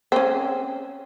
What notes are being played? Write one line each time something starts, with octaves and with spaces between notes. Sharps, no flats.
C4 C#4